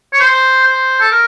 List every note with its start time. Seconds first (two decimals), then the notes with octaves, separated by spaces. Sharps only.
0.13 C#5
0.20 C5
0.66 C5
1.01 A4
1.12 A#4